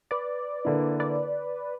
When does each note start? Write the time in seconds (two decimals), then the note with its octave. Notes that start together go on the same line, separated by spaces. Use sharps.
0.11 B4 D5
0.65 D3 A#3 E4
1.00 B4 D5